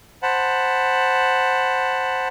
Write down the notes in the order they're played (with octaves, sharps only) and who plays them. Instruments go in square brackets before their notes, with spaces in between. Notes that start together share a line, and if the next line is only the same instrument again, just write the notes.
[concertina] C5 F#5 A5 B5